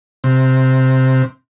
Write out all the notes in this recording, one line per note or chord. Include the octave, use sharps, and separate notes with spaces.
C3